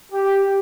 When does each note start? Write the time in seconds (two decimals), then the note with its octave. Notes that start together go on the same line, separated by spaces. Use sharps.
0.12 G4